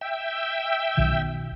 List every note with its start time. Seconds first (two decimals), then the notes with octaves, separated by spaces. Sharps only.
0.01 E5 G5
0.97 B1 B2 D#3